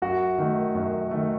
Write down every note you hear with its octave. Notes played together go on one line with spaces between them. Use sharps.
F#2 F#4
D#3 A3
F#2
D#3 A3